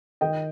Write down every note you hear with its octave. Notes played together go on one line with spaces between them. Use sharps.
D#3 D#5 G5